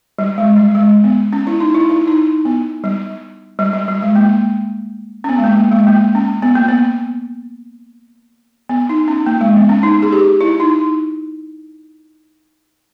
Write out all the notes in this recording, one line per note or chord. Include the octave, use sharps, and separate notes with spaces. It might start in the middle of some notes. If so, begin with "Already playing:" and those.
G3
G#3
G3
G#3
B3
C#4
E4
D#4
E4
E4
D#4
B3
G3
G3
G3
G3
G#3
A#3
C#4
B3
G#3
A#3
A#3
G#3
A#3
C#4
B3
A#3
B3
B3
D#4
C#4
A#3
G#3
B3
C#4
D#4
G#4
G4
E4
D#4